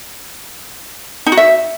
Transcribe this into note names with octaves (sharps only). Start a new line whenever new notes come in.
D#4
F#4
E5